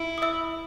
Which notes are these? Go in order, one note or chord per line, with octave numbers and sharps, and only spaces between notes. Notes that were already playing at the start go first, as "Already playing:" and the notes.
Already playing: E4
D#6
E5 E6